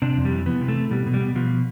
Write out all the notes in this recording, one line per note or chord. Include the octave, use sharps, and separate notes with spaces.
C3 D4
F2
G3
E3
E3 B3
C3
A3
E3
B2 G3
B2
G3
B2
B2 F3